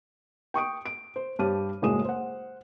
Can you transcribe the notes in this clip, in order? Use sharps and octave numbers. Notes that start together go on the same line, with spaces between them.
G5 C#6 D#6 D7
D7
C5
G2 G4 C#5 A5 F6 D#7
F#1 A2 G#3 F#4 D#6 E7
C5 F#5